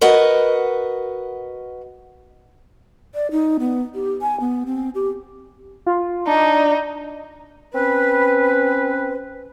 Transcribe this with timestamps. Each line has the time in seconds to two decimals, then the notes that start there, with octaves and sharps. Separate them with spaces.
0.01 F#4 A#4 B4 D#5 F#5
3.15 D5
3.31 D#4
3.60 B3
3.95 G4
4.22 G#5
4.40 B3
4.66 C4
4.95 G4
5.86 F4
6.27 D4 D#4
7.74 C4 C#4 B4